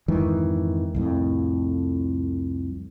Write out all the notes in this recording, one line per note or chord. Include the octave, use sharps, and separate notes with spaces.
F2 G#2 D#3 E3
C2 F2 A2